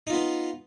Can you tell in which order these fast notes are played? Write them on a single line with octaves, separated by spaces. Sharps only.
D#4 F4 B3